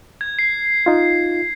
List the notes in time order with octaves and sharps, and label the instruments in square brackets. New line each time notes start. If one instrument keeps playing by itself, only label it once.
[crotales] G#6
C7
[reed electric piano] D#4 F4